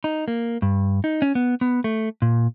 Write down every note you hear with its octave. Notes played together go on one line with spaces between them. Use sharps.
D#4
A#3
G2
D#4
C#4
B3
B3
A3
A#2